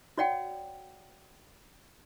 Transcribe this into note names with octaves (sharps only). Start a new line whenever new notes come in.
F#4 C#5 D5 F#5 G5